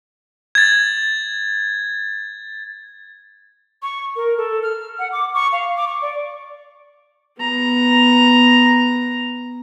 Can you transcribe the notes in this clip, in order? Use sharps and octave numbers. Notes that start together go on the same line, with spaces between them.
G#6 A6
C#6
A#4
A4
F6
F#5
D6
C#6
F5
D6
C#6
D5
B3 A#5